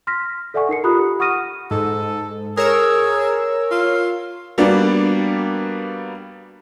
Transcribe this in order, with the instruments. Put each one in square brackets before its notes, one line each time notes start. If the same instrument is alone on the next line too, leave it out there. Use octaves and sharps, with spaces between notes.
[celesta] C6 F6 A#6 B6
A4 D5 E5 F#5 G#5 C#6
D#4 A#4 C7 C#7
F4 G4 A#5 B5 D#6 F#6
F#5 C#6 D#6 F6 A#6 D#7
[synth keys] G#2 [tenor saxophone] A4
[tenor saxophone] G#4 [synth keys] A#4 C#5 E6
[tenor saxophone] F4
[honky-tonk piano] G3 A#3 B3 D4 F#4